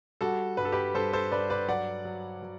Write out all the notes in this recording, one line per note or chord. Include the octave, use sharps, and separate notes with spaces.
G3 F#4 A4
G2 B4
A4
G4 B4
G2 A4 C5
A4 C5
G2 B4 D5
B4 D5
F#3 D5 F#5
F#3
F#3